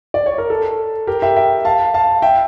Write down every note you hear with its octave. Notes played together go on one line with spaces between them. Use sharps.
D5
C#5
A#4
A4
G4 A#4
E5 G5
E5 G5
F5 A5
F5 A5
E5 G5